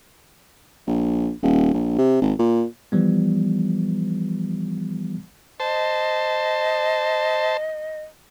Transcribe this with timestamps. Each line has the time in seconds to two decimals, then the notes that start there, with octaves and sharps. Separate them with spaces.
0.87 A#1
1.43 D#1
1.74 A#1
1.98 C3
2.22 G#1
2.39 A#2
2.92 E3 F3 G3 B3
5.60 C5 D#5 A5